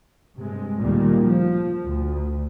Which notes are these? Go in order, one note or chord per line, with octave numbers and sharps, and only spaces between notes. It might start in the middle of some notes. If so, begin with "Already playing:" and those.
G2 C3 G#3
D2 A#2 D#3 G3 A#3
F3
D2